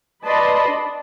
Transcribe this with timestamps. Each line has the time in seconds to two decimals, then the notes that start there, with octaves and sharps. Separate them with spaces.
0.24 B4 D5 D#5 A5 B5 C6
0.68 D4